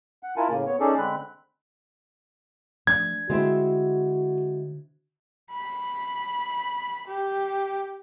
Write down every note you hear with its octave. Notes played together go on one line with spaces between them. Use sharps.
F#5
E4 F4 A#4 G#5 A5
A2 C#3 A#3
B3 C#5
C#4 D#4 G#4 A4 D5
D3 G#3 C4 B5 F#6
F3 A3 D4 G#6
D3 G#3 C4 E4 F#4
B5
G4